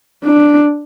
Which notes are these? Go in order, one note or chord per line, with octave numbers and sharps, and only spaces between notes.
D4